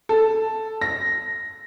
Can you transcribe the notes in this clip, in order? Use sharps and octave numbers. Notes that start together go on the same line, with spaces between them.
A4
A#6